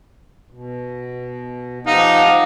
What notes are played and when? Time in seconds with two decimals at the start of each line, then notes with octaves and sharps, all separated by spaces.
0.50 B2
1.87 F3 D#4 G4 F5 F#5